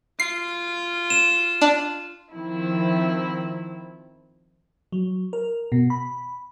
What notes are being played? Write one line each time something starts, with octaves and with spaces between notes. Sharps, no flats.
F4 C7
E7
D4
D#3 F3 C4 E4
F#3
A#4
B2
B5